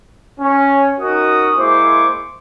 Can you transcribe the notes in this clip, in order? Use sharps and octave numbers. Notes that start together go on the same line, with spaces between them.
C#4
C#4 D#4 F#4 A#4 D#5 D#6
G#3 A#3 E4 C5 C#6 D6